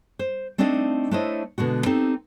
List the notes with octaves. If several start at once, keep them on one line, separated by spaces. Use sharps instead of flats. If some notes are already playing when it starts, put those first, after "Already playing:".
C5
A3 C4 D4 D#4 D5 D#5
A3 D4 E4 C5 C#5 D#5
B2 D3 G#3 F#4
C4 D#4 G4 A4